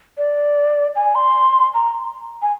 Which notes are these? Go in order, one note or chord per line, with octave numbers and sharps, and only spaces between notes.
D5
G#5
C6
A#5
G#5